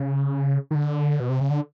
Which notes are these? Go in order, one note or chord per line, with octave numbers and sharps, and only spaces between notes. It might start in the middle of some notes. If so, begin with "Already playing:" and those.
Already playing: C#3
D#3
D3
B2
C3
C#3
D3